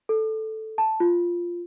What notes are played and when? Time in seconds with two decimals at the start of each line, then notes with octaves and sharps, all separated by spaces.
0.09 A4
0.78 A5
1.00 F4